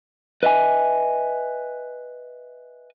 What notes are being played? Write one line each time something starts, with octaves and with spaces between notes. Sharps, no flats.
B4 D#5 E5 G#5